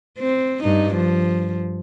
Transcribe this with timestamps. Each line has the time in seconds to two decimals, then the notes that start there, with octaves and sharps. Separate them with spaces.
0.18 C4
0.63 G2 D#4
0.95 F3